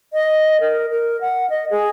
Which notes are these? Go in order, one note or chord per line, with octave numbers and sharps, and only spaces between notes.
D#5
A#4
A#4
F#5
D#5
G#4